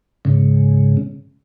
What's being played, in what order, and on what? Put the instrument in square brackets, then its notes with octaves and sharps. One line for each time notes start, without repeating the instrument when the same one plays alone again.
[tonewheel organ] G#2 C#3